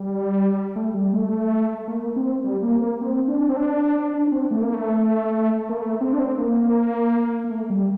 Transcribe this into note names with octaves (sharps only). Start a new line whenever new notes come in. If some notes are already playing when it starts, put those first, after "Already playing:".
Already playing: G3
A3
G3
A3
A#3
C4
G3
A#3
A#3
C4
D4
C4
D4
D4
D4
C4
A3
A#3
A3
A#3
A3
C4
D4
C4
A#3
A#3
A3
G3